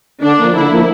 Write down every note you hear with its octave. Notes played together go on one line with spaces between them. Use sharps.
D3 D4
F3 A#3
D3 E4
F3 A#3